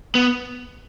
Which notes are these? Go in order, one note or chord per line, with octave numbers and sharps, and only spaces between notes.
B3